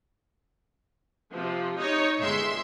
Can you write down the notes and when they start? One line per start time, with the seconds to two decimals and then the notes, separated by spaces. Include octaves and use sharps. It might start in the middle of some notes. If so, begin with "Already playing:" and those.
1.32 C3 F3
1.78 D#4 C#5
2.18 G1 G#3 E5 C6